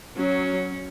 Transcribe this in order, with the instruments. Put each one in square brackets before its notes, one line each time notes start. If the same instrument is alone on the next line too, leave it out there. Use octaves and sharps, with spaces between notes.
[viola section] F#3 [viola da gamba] C#4